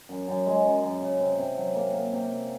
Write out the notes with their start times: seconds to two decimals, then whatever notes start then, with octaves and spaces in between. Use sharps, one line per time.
0.09 F#2
0.28 F#2
0.46 G#3
0.65 F#2
0.83 F#2
1.02 C#3
1.20 C3
1.39 C3
1.57 F#3
1.76 A#3
1.94 A#3
2.12 C3
2.31 C3